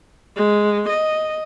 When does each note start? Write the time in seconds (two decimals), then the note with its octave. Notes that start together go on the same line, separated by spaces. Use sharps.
0.36 G#3
0.89 D#5